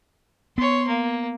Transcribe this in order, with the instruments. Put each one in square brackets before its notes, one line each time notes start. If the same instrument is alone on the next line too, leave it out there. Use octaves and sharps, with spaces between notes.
[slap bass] B3 [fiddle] C#5 C6
[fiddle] A#3